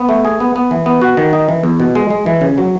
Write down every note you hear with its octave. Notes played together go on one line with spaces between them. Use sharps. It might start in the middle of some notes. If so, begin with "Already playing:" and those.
Already playing: B3
A3
G#4
B3
B3
E3
B3
F#4
D#3
D#4
E3
E2
B2
G#3
G#3
E3
C#3
F#3